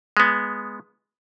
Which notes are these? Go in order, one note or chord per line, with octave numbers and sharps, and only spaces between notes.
G#3 B3